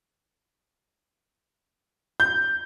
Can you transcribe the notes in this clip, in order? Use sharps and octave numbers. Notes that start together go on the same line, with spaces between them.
G6